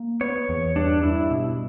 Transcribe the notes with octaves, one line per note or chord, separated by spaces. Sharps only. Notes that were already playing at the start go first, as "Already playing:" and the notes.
Already playing: A#3
B3 C#5
E2
G2 D4
G2 E4
B2